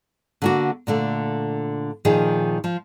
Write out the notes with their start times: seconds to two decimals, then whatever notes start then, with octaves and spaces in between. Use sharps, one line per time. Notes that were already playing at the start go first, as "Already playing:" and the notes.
0.42 D3 A#3 F#4
0.87 A#2 D3 A3
2.05 A#2 D#3 F3 G#4
2.64 F3